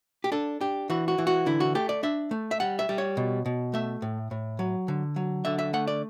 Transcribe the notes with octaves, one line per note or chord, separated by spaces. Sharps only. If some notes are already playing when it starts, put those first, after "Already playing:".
G4
D4 A4
D4 G4
E3 F#4
F#4
E3
F#4
D3 E4
F#4
A3 G4
D5
D4 E5
A3
E5
G3 F#5
E5
G3
C#5
B2
B2
A3 E5
A2
A2
F#3
D3
F#3
D3 E5
E5
A3 F#5
D5